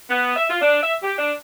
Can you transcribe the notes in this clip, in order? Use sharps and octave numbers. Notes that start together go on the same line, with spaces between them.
B3
E5
F4
D4
E5
G4
D4